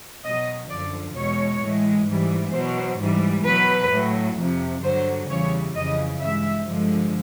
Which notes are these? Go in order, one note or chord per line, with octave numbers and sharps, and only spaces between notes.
B2 F#3 D#5
F#2 D3 F3 D5
E2 B2 G#3 C#5
A2 E3 G#3
G#2 E3 G3
B2 F#3 C5
G#2 E3 G3
B2 F#3 B4
A2 F#3
F2 C3 F3
G2 D3 F#3 C5
E2 C#3 E3 G3 C#5
F2 C#3 E3 D#5
G2 E3 G#3 E5
G2 D3 F3 G#3